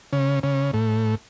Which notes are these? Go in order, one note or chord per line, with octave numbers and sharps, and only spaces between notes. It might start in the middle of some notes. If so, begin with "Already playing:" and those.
C#3
C#3
A2